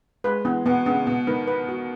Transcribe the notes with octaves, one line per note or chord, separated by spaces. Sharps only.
G#3 B4
E3 B3
B2 B3
C#3 B3
B2 B3
D#3 B4
B4
F#4